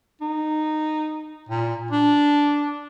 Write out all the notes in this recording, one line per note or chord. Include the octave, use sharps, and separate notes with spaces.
D#4
A#2
D4